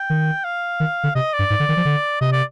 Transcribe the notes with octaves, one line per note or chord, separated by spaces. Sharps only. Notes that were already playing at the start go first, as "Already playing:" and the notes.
Already playing: G5
D#3
F5
D#3
D3
C3 D#5
D5
G2
G#2
D3
D#3
F3
D3
C3 D#5
D5